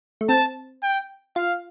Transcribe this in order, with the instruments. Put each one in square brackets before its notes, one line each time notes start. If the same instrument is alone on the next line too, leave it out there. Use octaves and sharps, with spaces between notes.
[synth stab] A3
[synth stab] C4 [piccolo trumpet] A5
[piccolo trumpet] G5
[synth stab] F4 [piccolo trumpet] F5